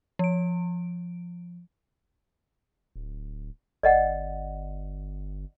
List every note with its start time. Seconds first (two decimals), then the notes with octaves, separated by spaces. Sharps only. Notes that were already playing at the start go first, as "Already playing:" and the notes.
0.19 F3 D7
2.96 D1
3.83 G1 D5 D#5 F#5